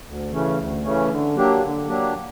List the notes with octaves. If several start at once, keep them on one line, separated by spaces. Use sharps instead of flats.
D2
C#3 E3 A3 C#4
D2
C#3 E3 A3 C#4
D3
F#3 A#3 D4 G4
D3
F#3 A#3 D4 G4